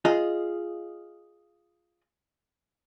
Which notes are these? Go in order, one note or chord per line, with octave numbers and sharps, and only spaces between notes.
F4 G#4 D#5